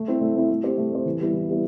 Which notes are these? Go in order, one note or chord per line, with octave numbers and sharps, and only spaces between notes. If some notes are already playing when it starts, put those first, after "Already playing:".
Already playing: A3
C4 E4
A3
C4 E4
A3
C4 G4 C5
A3
C4 G4 C5
E3
G3 B3 E4
E3
G3 B3 E4